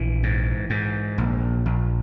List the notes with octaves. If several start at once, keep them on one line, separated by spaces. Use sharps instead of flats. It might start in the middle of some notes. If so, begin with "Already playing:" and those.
Already playing: A#1 E3
G#2
G#2
A#1
A#1